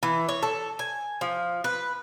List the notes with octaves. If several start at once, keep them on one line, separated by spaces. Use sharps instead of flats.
E3
C#5
A4
G#5
F3
B4